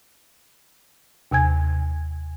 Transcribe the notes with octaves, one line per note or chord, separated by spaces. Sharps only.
D#2 C3 G#5 G#6